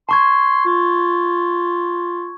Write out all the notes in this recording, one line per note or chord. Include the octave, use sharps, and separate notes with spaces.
A5 C6 C#6 G#6
F4